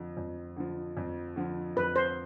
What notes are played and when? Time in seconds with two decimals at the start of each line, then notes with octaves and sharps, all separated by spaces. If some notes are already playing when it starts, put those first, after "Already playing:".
Already playing: F2 D3 F3
0.17 F2
0.57 D3 F3
0.97 F2
1.36 D3 F3
1.76 F2 B4
1.96 C5